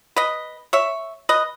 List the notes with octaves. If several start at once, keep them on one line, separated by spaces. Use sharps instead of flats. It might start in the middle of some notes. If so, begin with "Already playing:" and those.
B4 D#5
C#5 E5
B4 D#5